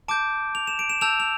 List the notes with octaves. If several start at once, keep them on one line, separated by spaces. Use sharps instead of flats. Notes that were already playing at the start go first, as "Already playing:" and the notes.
A5 D6 G6 D7
F7
E7
D7
E7
A5 E6 G6 F7
F7